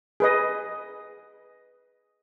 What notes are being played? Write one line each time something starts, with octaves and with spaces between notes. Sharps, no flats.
G#4 B4 D#5